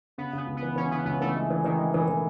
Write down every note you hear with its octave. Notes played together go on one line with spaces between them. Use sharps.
C#3 B3
C#3 B3
C#2
B3
E3
E3 C#4
C#3 B3
C#2 B3
E3 A3
G#3 A3
E3
D#3 E3
G#3
B2 E3
E3